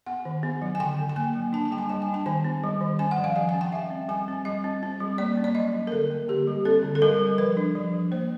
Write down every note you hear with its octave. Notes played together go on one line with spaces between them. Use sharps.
B3 F#5
D#3
B3
F#3
G#5
D3 G5
D3
G5
A#3 G#5
F#3
D4 A5
A5
G3 G5
G#5
G3 G5
G#5
D4
A5
D#3 G#5
B3
G3
D#3
C#4 G#5
F#5
F3
F5
F3 G#5
G#5
C#4
G5
G3 E5
C4
G3 G#5
C4
G3 D#5
C4
C4
G3
A#3 D5
C#4
D5
F#3 D#5
F#3
A#4
D3 A4
A#3
D3 G4
G3
C4 A4
D3
A4
G3 A#4
G3
F3 B4
D4
F3
F3
A#3 C5